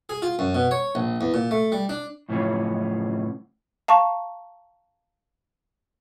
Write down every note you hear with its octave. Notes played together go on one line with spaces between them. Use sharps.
G#4
F4
F#2
B2
C#5
A#1
E2
A#2
A3
G3
D4
F#2 A2 C#3 F3 C#4
F5 A5 A#5 C#6